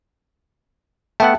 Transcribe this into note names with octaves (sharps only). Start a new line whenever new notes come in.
A3 B3 E5 F#5 G5 A5